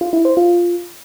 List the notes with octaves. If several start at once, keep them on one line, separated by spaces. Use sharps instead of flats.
F4
E4
C5
F4